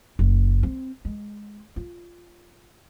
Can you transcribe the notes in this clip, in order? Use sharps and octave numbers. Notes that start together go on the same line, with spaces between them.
F#1
C4
G#3
F4